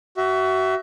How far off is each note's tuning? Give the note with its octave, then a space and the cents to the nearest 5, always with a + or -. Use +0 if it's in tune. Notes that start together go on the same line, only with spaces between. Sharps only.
F#4 +30 E5 +0